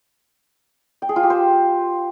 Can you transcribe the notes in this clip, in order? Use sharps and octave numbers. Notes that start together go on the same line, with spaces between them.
G5
G#4
F4
G4
C5